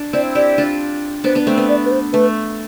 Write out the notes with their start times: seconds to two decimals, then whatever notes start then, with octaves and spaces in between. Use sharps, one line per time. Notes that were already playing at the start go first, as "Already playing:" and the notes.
Already playing: D4
0.13 C4 E4 D5
0.35 E4 G4 D5
0.58 D4 F4
1.24 B3 D4 C5
1.35 B3 D4
1.47 A3 C4
1.58 B3
1.69 D5
1.85 B4
1.92 C5
2.13 A3 B4